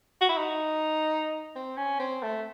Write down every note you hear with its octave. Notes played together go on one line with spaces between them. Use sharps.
F#4
E4
D#4
C4
C#4
C4
A3